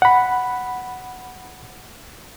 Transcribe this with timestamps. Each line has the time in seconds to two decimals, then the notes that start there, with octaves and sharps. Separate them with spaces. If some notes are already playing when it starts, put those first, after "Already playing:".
0.02 F#5 B5